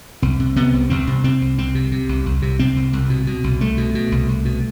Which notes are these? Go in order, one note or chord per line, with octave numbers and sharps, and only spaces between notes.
C2 C4
C3
C3 B3
C2
C2 C4
C3
C3 C4
C2
C2 C4
C3
C3
C2
C2
C3
C3 C4
C2
C2
B2
B2
C2
C2 A3
B2
B2
C2
C2
B2